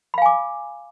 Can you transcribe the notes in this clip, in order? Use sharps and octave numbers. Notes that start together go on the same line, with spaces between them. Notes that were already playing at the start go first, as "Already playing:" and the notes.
F5 G#5 B5 D6